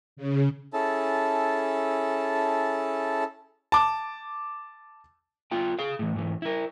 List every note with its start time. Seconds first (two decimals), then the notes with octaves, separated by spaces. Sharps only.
0.17 C#3
0.73 C#4 E4 G#4 A4 A5
3.72 A5 D6
5.51 B3 F4 G5
5.79 G#4 F5
5.99 A2 E3
6.16 G#2 E3
6.42 E4 A#4